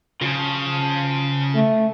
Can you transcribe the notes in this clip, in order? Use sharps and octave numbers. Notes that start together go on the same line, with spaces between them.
C#3 F4 A5
A3